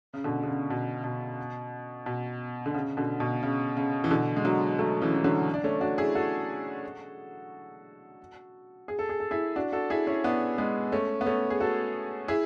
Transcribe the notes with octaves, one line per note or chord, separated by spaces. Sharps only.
C#3
B2 D3
D3
C#3
B2
B2
B2
D3
C#3
B2 D3
B2
C#3
C#3
E3
B2 D3
G#3
D3 F#3
F#3 A3
C#3 E3
E3
D3 F#3
D4
A3 C#4
D4 F#4
E4 G#4
F#4 A4
G#4
A4
G#4
A4
E4 G#4
D4 F#4
F#4 A4
E4 G#4
C#4 E4
B3 D4
G#3 B3
A3 C#4
B3
A3 C#4
G#4
F#4 A4
E4 G#4